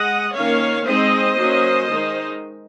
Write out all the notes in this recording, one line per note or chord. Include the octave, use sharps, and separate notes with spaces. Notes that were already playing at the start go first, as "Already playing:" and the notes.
Already playing: G#3 D#5 F#5
D#3 A#3 C#4 C#5 F5
G#3 C4 D#4 C5 D#5
F#3 A#3 C#4
D#3 G#3 D#4